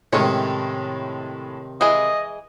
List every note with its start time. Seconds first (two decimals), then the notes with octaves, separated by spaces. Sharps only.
0.13 A2 C3 D#3 G#3 A3 C#4 C#5
1.81 E3 G#3 G#4 D#5